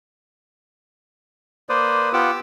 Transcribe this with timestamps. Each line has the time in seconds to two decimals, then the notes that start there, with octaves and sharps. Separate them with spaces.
1.69 A#3 B4 C5 D5 D#6
2.13 B3 F4 G4 F#5 D6 E6